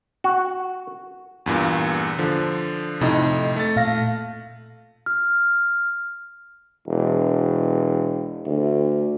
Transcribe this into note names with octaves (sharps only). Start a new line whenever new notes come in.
F#4
E2 G2 A#2
D3 F3
F2 A2 C3 D#4
A3 A6
A#2 F5 A#6
F6
E1
D2